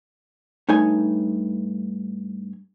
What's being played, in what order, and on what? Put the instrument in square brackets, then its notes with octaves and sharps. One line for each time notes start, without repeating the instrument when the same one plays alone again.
[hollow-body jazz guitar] G2 A3 D#4 C#5 G#5